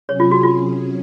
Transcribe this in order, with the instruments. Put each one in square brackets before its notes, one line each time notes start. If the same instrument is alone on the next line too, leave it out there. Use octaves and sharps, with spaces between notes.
[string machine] C3 F#3 C#4 G#4 [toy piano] C#5
[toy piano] F4
F#4
F4